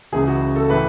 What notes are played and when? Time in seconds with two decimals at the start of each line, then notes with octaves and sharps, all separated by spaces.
0.12 C#2 C#3 E3 G#4
0.27 F#4
0.56 A4
0.70 A2 E3 B4